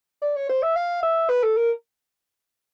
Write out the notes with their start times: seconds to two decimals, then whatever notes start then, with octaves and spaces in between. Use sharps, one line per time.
0.22 D5
0.36 C#5
0.49 C5
0.62 E5
0.76 F5
1.03 E5
1.30 B4
1.43 A4
1.57 A#4